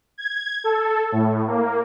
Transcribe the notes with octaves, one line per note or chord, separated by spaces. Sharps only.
G#6
A4
A2
A#3